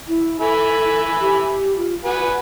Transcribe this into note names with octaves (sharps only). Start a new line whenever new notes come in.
E4
A4 E5 G#5 B5
G4
F4
F#4 B4 F#5 G#5